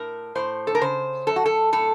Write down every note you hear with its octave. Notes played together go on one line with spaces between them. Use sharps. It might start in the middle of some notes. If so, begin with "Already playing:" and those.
Already playing: A2 A#4
A2 C5
A4
A#4
C#3 C5
F#2 A4
F#4
A4
A2 A4